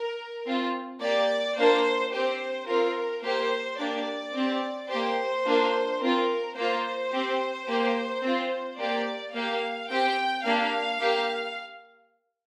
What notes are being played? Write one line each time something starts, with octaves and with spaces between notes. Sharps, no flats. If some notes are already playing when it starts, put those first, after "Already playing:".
Already playing: A#4
C4 F4
A#3 G4 D5
A#3 D4 F4 C5
C4 G4 C5
C4 F4 A#4
A#3 G4 C5
A#3 D4 G4 D5
C4 G4
A#3 G4 C5
A#3 D4 F4
C4 F4 A#4
A#3 F4 C5
C4 G4
A#3 G4
C4 F4
A#3 G4 D5
A#3 G4 F5
C4 G4 G5
A#3 D4 G4 F5
A#3 G4